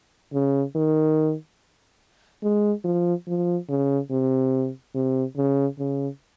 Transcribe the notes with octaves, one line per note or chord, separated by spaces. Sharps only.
C#3
D#3
G#3
F3
F3
C#3
C3
C3
C#3
C#3